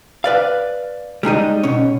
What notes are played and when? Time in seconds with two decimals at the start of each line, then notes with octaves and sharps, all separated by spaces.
0.24 B4 D5 F5
1.23 G3 G#3 D#4 D#5
1.63 B2 C#4